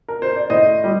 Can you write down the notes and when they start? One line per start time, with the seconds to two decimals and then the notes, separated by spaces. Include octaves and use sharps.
0.08 A#4
0.22 C5
0.36 D5
0.50 A2 C5 D#5
0.84 G3